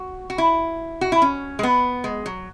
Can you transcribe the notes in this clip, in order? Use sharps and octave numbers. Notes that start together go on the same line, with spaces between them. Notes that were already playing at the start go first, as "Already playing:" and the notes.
Already playing: F#4
F#4
E4
F#4
E4
C#4
G#3
B3
G#3
F#3